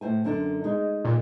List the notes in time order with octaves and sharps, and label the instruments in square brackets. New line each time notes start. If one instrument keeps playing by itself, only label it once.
[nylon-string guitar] A2 C5 G#5
F#2 D3 D4
G#3 D#4
[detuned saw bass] A#2